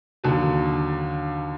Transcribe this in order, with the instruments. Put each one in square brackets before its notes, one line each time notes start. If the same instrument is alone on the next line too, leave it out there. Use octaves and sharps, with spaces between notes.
[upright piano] D#2 D3 F#3